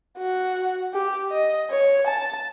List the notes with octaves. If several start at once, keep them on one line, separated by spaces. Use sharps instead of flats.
F#4
G4
D#5
C#5
A5